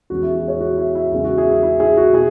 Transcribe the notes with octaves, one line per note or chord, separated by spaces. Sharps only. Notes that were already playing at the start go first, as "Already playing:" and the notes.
E2 E3 G#3 C#4 F#4
E4
G#4
F#4
G#4 C#5
F#4
E4
E4
E2 C#3 G#3 B3 E4
F#4
E4 G#4
E4
E4
E4 G#4
F#4
B2 E4 G#4